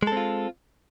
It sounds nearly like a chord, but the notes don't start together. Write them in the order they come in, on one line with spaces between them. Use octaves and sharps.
G#3 A4 C4 F4